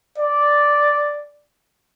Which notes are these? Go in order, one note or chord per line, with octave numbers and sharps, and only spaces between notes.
D5